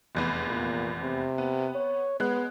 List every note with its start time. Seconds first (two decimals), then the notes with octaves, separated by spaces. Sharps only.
0.15 F1 E2 B3
0.47 A#2
1.01 C3
1.38 B3
1.75 C#5
2.20 G#3 B3 F#6